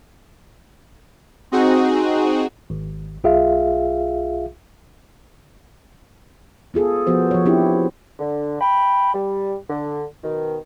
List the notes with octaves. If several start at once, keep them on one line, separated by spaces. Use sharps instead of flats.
C4 D#4 F#4 G#4
G#1
B1 F4 G#4 E5 F5
B3 F4 G#4 A4
F3 B3 F#4 C5
F3 C#5
B3 C4 D4 E4 G4
D3
G5 B5
G3
D3
B2 D#3